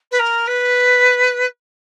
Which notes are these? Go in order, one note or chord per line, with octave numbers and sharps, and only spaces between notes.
B4
A#4
B4